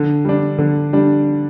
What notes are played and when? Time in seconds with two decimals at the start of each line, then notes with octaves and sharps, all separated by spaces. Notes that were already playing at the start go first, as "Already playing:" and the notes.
Already playing: D3
0.25 G3 D4
0.58 D3
0.93 G3 D4